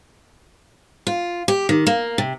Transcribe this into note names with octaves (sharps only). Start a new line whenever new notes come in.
F4
G4
D#3
A#3
C3